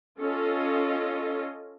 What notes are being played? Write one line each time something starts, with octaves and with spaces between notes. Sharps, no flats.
C#4 F4 A4 D#5